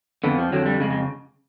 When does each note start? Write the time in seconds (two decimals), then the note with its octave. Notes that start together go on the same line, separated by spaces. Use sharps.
0.24 F2 D3 B3
0.38 F3
0.52 F2 D3 F#3
0.66 G3
0.80 F2 C#3 G#3
0.90 G#3